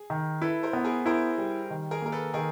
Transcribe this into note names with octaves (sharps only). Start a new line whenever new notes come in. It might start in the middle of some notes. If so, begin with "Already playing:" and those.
Already playing: G#4
D#3
E4 A4 B4
A#4 C5
B3
G#4 A#4
E4 A#4 C5
G3
D#3
G#4 A#4
A#3 A#4
A4 B4
D#3 G#4 A#4